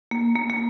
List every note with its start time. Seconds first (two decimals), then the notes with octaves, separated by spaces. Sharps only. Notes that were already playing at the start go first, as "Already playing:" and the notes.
0.11 A#3
0.36 A#3
0.50 A#3